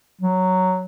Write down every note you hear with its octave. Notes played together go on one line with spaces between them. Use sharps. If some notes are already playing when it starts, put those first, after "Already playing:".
F#3